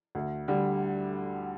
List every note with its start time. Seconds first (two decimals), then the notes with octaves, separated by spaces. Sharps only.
0.15 D2
0.48 D3 G3